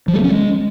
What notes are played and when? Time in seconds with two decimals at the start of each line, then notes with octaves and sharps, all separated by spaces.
0.08 F3
0.13 G3
0.19 A3
0.24 C#4
0.29 G#3